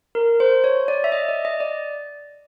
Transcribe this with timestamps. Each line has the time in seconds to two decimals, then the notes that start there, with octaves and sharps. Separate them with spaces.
0.15 A#4
0.40 C5
0.64 C#5
0.88 D5
1.04 E5
1.12 D#5
1.29 D5
1.45 D#5
1.60 D5